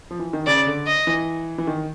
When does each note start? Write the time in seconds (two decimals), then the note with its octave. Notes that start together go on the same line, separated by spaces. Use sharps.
0.11 F3
0.19 E3
0.33 D#3
0.47 C#3 D5
0.67 D3
0.87 D#5
1.07 E3
1.58 E3
1.67 D#3